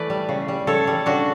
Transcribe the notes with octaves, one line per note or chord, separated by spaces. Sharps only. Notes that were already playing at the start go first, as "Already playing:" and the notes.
Already playing: E3 A3 B4 D5
G3
C#3
G3
C#3 A4 C#5
G3
C#3 D4 F#4